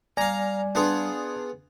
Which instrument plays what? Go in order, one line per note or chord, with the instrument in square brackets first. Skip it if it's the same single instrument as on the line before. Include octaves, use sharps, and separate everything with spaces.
[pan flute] G3 [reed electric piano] D5 G#5 [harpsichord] F5 A#5
[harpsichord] B3 F4 G#4 [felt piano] D4